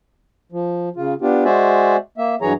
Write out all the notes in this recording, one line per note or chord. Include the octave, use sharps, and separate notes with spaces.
F3
C#3 F4
B3 D4 F4 G4
G#3 F#4 C5 D5 E5 G#5
A#3 E5
G2 E3 F#3 G#4 C#5 A#5